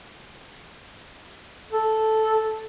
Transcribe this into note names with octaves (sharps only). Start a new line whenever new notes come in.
A4